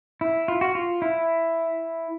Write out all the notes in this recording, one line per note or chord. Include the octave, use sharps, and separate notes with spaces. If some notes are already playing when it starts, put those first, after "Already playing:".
E4
F4
F#4
F4
E4